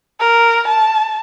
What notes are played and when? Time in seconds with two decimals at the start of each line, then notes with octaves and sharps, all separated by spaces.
0.20 A#4
0.68 A5